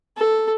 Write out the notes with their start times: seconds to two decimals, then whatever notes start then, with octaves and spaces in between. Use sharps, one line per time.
0.17 A4